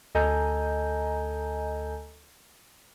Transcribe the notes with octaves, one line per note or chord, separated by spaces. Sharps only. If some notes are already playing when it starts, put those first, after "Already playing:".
D2 A4 D#5 G#5 A#5 G6